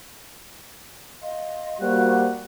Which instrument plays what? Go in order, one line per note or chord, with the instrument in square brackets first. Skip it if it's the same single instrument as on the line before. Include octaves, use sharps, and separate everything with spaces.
[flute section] D#5 F5 C6
[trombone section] G3 A#3 F#4 [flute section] C5 F#6